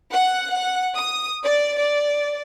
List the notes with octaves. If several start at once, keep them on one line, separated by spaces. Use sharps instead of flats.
F#5
F#5
D#6
D5
D5